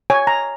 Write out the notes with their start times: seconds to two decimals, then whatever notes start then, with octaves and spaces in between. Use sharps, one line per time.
0.10 C#5 G#5
0.27 A#5